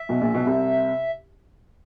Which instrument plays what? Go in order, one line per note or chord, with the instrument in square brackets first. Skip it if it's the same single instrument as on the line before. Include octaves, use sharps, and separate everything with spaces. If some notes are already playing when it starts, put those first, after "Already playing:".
Already playing: [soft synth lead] E5
[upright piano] B1 B2
A#1 A#2
B1 B2
C2 C3